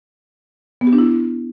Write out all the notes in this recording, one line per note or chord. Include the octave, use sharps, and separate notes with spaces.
B3
G4
D4
E4